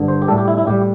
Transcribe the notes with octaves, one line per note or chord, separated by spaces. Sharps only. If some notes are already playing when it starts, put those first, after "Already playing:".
Already playing: G2 D3
C5
G4
A2 G3 A4
G4
E4
E4
A2 G3 G4